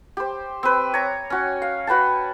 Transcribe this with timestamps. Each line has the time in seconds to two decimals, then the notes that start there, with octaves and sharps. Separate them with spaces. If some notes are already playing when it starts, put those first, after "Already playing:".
0.17 G4 C5
0.63 C4 B4
0.94 C#5 A#5
1.30 C#4 F#4
1.62 F5
1.87 F#4 B4 G5 A5